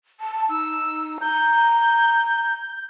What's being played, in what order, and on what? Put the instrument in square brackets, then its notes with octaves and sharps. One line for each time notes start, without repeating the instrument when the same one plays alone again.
[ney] A5
[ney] D#4 [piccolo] E6
[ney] A#5 [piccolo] G6